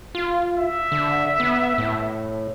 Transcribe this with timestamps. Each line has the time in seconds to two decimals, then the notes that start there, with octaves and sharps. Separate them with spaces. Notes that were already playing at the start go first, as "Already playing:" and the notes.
0.15 F4
0.56 E5
0.92 D3
1.40 B3
1.78 A2